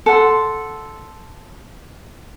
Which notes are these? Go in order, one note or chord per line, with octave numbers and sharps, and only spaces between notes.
A4 F#5 C6